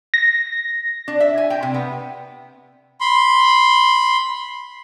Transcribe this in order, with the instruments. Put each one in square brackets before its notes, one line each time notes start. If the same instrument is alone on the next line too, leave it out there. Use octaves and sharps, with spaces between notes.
[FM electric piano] A#6
[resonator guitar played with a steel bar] D4
E5
G#5
G5
C3
B3
[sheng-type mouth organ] B5 C6